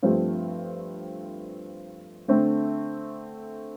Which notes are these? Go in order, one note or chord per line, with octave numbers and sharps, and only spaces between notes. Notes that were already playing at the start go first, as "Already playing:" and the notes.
G2 F3 A3 C4
D3 A3 C4